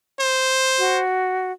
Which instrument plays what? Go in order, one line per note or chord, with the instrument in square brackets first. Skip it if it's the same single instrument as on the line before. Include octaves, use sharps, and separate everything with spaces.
[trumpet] C5
[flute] F#4